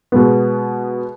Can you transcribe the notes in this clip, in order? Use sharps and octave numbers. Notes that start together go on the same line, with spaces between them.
B2 G#3 B3